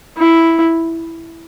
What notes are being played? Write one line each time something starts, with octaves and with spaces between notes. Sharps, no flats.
E4